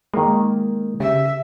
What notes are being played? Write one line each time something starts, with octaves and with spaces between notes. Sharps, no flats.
D#3 G#3 A#3
C#3 G4 E5